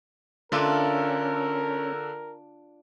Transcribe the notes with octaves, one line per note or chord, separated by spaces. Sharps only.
D3 C#4 D4 F4 A4 A#4 E5